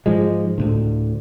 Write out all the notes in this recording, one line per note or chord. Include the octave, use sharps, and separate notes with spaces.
G#2 F3 G#3
D2 A2 D3